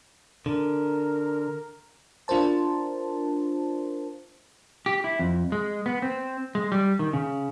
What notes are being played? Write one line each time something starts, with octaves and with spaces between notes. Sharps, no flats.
D3 A#4
D4 F4 A#4 C5 A5
G4
E4
F2
G#3
B3
C4
G#3
G3
D#3
C#3